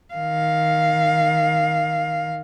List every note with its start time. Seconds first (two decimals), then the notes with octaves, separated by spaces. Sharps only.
0.14 D#3 F5